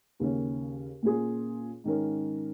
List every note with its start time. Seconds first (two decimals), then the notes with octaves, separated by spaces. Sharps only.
0.20 D#2 C#3 A#3 C#4
1.03 A#2 A#3 C#4 F4 G#4
1.84 G#2 D#3 C#4 A#4